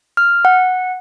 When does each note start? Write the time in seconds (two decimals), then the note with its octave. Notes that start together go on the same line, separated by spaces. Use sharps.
0.17 F6
0.45 F#5